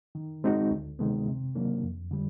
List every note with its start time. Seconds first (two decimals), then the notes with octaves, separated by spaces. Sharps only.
0.15 D#3
0.44 G#3 C4 D#4 F#4
0.71 D2
0.99 C3 D#3 G#3 B3
1.28 C3
1.55 D#3 F#3 A#3 D4
1.83 F2
2.11 D3 G3